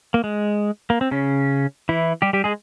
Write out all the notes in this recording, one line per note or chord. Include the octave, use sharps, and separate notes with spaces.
A#3
G#3
A#3
C4
C#3 C#4
E3 E4
G3 G4
G3 G4
G#3 G#4